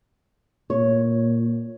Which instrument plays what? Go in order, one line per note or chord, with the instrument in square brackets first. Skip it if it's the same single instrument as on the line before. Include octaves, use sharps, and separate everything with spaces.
[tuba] A#2 [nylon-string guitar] C#5